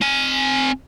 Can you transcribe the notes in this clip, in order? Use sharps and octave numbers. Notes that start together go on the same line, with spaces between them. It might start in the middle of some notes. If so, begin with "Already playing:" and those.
C4 G#5